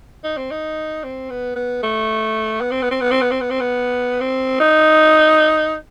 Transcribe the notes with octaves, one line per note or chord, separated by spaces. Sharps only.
D#4
C4
D#4
C4
B3
B3
A3
B3
C4
B3
C4
B3
C4
B3
C4
B3
C4
B3
C4
D#4